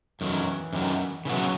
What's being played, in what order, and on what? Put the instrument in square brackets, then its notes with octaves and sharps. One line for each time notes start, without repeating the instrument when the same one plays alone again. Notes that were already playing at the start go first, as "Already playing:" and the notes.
[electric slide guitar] F#2 D#3 F#3 [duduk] E3
[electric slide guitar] F#2 D#3 F#3
[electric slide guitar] C#3 E3 B3 F#4 [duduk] F#3